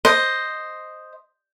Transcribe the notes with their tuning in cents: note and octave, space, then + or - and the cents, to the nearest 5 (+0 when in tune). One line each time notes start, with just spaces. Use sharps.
C5 +0 D#5 +0